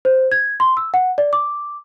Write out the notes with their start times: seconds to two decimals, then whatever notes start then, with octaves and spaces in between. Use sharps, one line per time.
0.05 C5
0.32 G#6
0.60 C6
0.77 E6
0.94 F#5
1.18 D5
1.33 D6